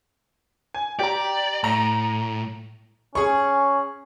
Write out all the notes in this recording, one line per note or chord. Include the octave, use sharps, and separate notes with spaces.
G#5
G4 D5 A#5
A2 A#5
C#4 G#4 C#6